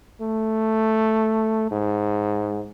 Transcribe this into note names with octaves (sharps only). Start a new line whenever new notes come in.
A3
G#2